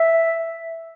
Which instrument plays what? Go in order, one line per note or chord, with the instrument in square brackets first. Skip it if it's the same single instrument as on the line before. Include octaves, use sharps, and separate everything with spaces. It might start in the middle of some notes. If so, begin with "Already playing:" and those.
Already playing: [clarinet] E5